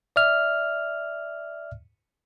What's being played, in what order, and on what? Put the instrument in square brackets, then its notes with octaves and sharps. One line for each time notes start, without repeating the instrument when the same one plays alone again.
[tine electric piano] D5 E5 F6